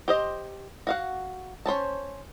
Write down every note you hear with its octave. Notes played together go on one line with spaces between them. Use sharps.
G4 C5 D#5
F#4 F5 F#5
C#4 C5 C#5 A5